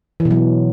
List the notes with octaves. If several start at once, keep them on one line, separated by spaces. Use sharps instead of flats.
E3
B2
F#3